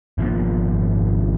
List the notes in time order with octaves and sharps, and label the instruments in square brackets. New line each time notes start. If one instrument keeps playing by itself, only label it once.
[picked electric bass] G#1 B2 F3 A#3